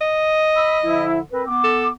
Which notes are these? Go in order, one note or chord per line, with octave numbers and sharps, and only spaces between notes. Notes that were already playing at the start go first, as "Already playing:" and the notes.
D#5
B5 E6
D3 F3 E4
C4 A#4 B4
B3 D6
A4